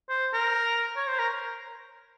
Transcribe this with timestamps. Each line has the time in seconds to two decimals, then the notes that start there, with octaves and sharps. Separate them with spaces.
0.09 C5
0.33 A#4
0.97 C#5
1.07 C5
1.19 A#4